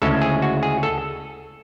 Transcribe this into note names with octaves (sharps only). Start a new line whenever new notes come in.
D2 C#3 G#3 C#4 E4 A4
G#4
F#4
G#4
A4